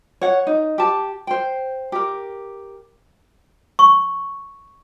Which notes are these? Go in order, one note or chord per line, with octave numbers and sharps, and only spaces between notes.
C#5 F#5
D#4
G4 A5
C5 G5
G4 A#4
C#6